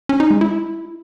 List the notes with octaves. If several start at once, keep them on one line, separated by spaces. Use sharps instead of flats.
C#4
D#4
G#3
E4